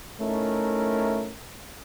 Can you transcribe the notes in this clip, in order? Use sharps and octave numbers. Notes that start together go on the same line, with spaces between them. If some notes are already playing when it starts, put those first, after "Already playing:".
A3 C#4 D#4 E4 A#4